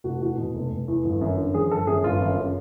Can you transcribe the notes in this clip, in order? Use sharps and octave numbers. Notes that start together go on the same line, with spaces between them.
F1 F#4
E2 F#4
B2
F1
F1
E2
G1
F#2
D3
F3 G#4
G1 A4
F#2 G#4
G1 F4
F#2
C#3